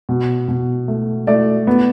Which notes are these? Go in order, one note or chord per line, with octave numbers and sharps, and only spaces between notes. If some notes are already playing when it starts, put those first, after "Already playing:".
B2
B2
A3
A3 D5
B3